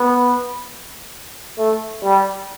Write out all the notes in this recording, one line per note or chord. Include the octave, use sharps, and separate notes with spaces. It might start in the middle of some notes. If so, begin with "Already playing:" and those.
Already playing: B3
A3
G3